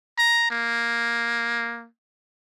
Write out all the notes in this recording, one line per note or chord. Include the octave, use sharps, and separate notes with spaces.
A#5
A#3